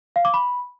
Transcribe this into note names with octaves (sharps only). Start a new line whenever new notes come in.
F5
D6
B5